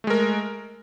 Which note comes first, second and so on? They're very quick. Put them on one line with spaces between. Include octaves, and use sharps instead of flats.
A3 G#3 A#4